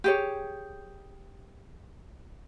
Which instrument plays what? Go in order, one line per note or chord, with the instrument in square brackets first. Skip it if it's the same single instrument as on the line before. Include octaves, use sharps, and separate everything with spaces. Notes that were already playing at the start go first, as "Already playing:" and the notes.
[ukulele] G4 G#4 C#5